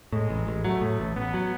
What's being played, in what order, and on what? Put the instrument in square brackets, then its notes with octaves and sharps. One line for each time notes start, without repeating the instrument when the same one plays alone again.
[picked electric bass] A2 [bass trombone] G#3
[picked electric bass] A1
A1
[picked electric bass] F#3 [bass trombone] A3
[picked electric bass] A2
A1
[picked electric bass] A1 [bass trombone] B3
[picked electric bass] F#3